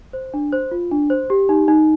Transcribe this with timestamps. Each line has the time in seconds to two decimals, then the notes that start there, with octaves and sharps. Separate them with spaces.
0.13 C5
0.34 D4
0.53 C5
0.71 F4
0.92 D4
1.10 C5
1.30 G4
1.49 D#4
1.68 D#4